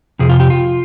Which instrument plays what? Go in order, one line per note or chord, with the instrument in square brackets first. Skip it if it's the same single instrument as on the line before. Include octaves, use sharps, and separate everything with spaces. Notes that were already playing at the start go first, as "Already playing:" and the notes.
[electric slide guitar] F2 C3 G#4
F4
G4
F4